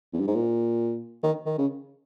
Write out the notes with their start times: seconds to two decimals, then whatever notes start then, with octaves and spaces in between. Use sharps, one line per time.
0.13 E2
0.20 G2
0.27 G#2
0.35 A#2
1.23 D#3
1.46 D#3
1.58 C#3